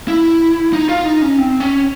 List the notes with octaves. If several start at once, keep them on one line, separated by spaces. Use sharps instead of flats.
E4
D#4
F4
D#4
C#4
C4
C#4